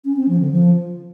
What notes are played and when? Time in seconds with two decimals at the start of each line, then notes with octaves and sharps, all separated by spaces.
0.05 C#4
0.17 C4
0.28 F3
0.40 D3
0.52 F3